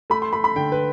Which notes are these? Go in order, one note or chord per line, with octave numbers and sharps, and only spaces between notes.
A3 B5
C6
A3 B5
B5
D3 G5
B4